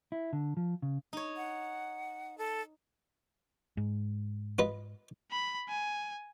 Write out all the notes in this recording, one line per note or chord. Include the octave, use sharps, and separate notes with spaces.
E4
D3
F3
C#3
D#4 C#5
F#5
A4
G#2
F4 B4 D#5
B5
G#5